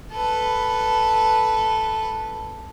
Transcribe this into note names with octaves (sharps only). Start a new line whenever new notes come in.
A4 B4